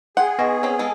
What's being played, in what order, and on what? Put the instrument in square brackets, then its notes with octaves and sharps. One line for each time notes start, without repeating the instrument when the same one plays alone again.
[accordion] G#4 [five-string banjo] F#5 [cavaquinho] G5 C6
[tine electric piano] B3 [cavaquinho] D#4 C6 C#6
[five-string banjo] C4 C#4
[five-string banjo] G#3 A4 [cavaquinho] A#4 F5